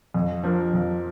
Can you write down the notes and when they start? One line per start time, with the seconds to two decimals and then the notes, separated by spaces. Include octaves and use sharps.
0.14 F2
0.43 F3 D4 A#4
0.73 F2